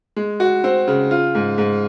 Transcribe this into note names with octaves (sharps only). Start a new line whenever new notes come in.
G#3
F#4
C4
C#3
F4
G#2
G#2